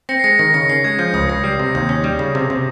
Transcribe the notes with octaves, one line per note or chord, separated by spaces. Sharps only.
C4 A#6 C#7
C7
G#3 A#6 C#7
D#3 A#6
C#3 A#6 C#7
C#4 C7
G#3 G#6
F3 G6
C#2 D#6
C#2 A#6 C#7
G3 C7
C3 A#6
D#2 G6
C#4
G3
C#3
C3
C3